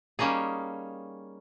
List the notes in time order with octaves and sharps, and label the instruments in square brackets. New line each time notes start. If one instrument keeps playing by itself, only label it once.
[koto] G3 A#3 C#4 D#4 G#4